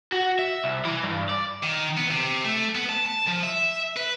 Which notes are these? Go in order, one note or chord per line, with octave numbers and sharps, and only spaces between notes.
F#4
E5
C2
E3
G2
D5
D#3
B3
C3
A3
B3
A5
A5
F3
E5
B4